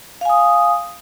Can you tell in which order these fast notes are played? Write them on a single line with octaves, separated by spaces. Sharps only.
F5 G#5 D#6